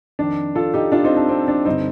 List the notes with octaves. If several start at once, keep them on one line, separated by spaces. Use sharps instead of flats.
F2 D#3 D4
F4 A4
D#4 G4
D4 F4
C4 D#4
D4
C4
D4
G2 D3 C4 D#4